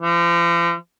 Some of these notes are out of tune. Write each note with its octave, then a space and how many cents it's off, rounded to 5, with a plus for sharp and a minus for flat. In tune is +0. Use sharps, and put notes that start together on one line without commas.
F3 -40